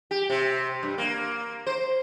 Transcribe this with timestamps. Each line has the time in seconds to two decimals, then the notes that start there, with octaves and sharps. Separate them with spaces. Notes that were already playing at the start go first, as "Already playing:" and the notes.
0.11 G4
0.30 C3
0.83 G2
0.98 A#3
1.67 C5